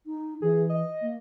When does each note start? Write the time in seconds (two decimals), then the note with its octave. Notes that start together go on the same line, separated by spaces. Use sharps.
0.06 D#4
0.42 E3 G#4
0.70 D#5
1.02 A#3